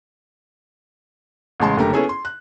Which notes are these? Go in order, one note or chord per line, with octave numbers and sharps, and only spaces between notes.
A1 C#3 G#3 A5 C6
F#1 D3 A3 G4 A#5
B3 C#4 E4 G#4 A4 C#5
C6
F#6